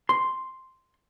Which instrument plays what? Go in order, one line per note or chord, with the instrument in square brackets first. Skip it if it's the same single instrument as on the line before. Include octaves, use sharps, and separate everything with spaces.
[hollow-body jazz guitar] C6